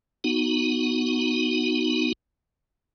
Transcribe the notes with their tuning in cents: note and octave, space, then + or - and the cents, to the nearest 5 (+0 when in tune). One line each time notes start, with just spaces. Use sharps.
B3 +0 D#4 +5 F#4 +0